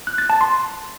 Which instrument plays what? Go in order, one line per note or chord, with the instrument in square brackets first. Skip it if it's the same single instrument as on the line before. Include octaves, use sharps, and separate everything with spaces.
[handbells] F#6
A6
A5
C6